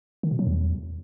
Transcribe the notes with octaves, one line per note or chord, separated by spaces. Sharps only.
D#3
B2
F#3
E2